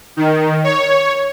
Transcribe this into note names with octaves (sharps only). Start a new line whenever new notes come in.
D#3
C#5